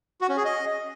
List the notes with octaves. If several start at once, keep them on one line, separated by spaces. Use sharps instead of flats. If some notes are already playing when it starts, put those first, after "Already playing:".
F#4
C#4
G#4
D#5